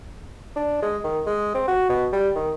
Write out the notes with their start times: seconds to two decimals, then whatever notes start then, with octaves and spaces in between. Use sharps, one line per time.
0.56 D4
0.82 G#3
1.04 D#3
1.27 G#3
1.54 C4
1.68 F#4
1.89 B2
2.13 G3
2.35 D#3